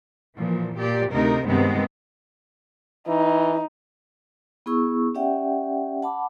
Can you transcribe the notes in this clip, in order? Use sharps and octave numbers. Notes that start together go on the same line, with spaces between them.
A#2 E3 F3
A#2 G4 D5
D2 C3 A3 D#4 A#4
G2 C3 D#3 G#3 B3 C4
E3 D#4
B3 E4 G#4 C#6 E6
C#4 G4 D5 E5 F#5 G5
F#5 A5 B5 D6